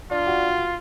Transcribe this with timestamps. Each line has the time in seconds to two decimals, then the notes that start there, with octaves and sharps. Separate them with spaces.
0.11 D4 F4
0.27 F#4